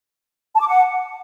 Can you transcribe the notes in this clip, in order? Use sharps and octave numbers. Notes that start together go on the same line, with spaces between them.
A5
D6
F#5